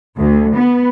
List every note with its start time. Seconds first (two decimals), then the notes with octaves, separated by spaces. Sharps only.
0.18 D2
0.55 B3